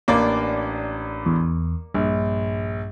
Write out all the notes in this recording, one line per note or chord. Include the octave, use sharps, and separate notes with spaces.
A1 A#3 D4 D5 D6
E2
A#1 G2